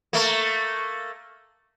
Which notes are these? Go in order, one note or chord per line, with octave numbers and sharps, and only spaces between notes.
A3 A#3